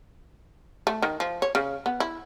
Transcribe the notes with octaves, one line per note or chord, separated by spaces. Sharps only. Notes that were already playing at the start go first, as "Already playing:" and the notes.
A3
D#3
F3
C#5
C#3
B3
E4